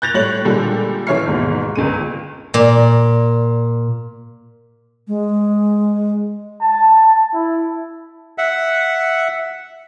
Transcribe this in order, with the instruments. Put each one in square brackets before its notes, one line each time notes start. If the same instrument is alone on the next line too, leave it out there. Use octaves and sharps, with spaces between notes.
[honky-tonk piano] F#6 G6 A6 A#6 F7
A2 G3 A3 C#5 F#7
A#2 D3 G3 G#3 G4 A4
A1 E3 C#5 E5 F6 C7
G1 D#2 G#2 B2
G1 C#2 C#3 D#7
[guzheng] A#2
[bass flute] G#3
[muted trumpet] A5
E4
[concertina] E5 F#5